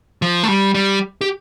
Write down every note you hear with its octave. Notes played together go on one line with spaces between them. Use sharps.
F3
A3
G3
G3
G4